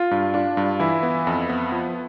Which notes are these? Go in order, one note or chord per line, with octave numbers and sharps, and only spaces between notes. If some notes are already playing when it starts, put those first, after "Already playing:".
Already playing: F4
G2
D4 F4
G2
E3 E4
B3
F2
B3
F3